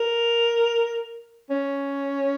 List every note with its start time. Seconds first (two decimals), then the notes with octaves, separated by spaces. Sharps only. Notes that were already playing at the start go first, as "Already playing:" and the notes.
Already playing: A#4
1.50 C#4